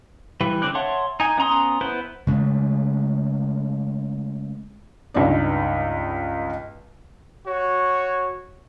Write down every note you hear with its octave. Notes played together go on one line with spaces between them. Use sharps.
E3 G3 B4
D3 C4 D5 F#6
C#5 E5 F#5 A5 C6
D#4 G#5
B3 C#4 A#5 C6 D#6
B3 E4 B4 C5
C#3 G#3 A3
C#2 G2 D#4 D5
F#4 C#5